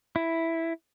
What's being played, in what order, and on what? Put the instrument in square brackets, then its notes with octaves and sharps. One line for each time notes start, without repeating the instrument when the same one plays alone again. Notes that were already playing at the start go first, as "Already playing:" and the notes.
[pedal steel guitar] E4